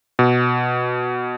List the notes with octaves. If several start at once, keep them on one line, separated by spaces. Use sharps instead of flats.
B2